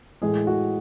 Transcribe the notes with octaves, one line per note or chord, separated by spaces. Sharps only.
A2 E3 G#3 G#4
F#4